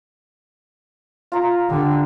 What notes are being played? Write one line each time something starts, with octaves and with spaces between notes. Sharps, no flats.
F4 A#5
D3 G4